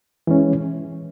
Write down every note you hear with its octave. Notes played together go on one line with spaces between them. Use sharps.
E3 G#3 C#4